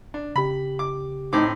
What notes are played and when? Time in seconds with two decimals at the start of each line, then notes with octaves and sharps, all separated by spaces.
0.14 D4
0.36 C#3 G4 B5
0.79 D6
1.33 A2 C4 D#4 D6